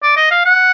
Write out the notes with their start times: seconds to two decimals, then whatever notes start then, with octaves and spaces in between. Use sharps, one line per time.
0.03 D5
0.17 D#5
0.31 F5
0.46 F#5